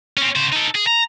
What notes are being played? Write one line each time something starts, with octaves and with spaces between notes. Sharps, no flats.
C4 C#4
C#3 C5
D#4 A4
G#4
A#5